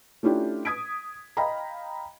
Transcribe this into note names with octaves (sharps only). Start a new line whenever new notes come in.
A3 C#4 D4 E4 F4 G4
D#6 G#6 B6 D7
D#5 F5 G5 A#5 B5